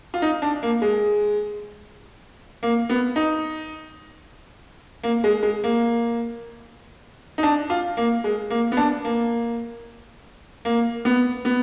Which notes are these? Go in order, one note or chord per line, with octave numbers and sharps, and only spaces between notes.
F4
D#4
D4
A#3
G#3
A#3
B3
D#4
A#3
G#3
G#3
A#3
D#4
D4
F4
A#3
G#3
A#3
B3
D4
A#3
A#3
B3
B3